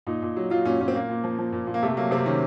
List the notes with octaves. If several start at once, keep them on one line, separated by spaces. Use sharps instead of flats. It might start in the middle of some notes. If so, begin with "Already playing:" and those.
A#2 D#4
A#2
F#3
F#3 F4
A#2 C#4
A#2 C#4
C4
A#2 A#3
A#2
F3
F3
A#2
A#2
A#3
C3 A3
F#3 A#3
C3 C4
D#3 C#4